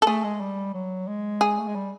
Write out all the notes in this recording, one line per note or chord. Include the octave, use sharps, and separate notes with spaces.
A4
A3 G#4
G#3
G3
F#3
G#3
G#4
A3
G#3
G3